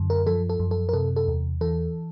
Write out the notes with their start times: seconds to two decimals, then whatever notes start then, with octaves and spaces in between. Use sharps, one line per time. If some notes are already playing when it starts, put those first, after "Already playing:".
Already playing: F#2 D3
0.10 A#4
0.27 F3 A4
0.50 A4
0.60 F#2
0.71 A4
0.89 A#4
0.93 C3 A4
1.16 A4
1.28 E2
1.61 E3 A4